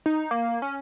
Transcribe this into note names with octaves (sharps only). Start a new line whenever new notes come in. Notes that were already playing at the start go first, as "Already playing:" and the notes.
D#4
A#3
C#4